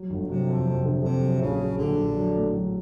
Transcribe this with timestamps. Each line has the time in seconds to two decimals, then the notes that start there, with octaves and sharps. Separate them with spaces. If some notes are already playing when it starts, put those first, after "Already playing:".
Already playing: F#3
0.10 G1
0.29 C3 F#3
0.48 F2
0.66 F2
0.85 D3
1.03 F2 C3
1.23 F#3
1.41 A#1 C#3
1.60 F#3
1.78 A#1 D3
1.98 A#1
2.16 F#3
2.35 A2
2.54 F#3